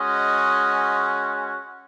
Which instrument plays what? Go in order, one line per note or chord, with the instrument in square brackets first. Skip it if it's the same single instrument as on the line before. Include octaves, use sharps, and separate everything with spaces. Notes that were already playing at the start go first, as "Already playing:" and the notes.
Already playing: [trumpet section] G#3 C#4 F#4 D#5